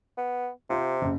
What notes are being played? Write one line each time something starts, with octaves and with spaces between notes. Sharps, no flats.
B3
C3 F4 C5
F#1